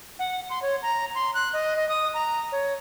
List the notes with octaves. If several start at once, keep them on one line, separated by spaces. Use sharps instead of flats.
F#5
C6
C#5
A#5
C6
F#6
D#5
D#5
D#6
A#5
C#5